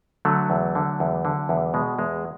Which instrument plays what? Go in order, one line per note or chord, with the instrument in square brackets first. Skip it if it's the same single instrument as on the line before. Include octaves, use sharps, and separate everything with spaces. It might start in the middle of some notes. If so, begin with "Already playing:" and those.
[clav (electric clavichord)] D3 F#3 A3
E2
D3
E2
D3
E2
B2 G#3
E2 G#3